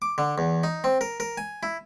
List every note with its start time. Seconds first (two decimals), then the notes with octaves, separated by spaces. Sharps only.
0.02 D6
0.18 D3
0.38 E2
0.64 D#4
0.84 C4
1.01 A#4
1.20 A#4
1.38 G#5
1.63 E4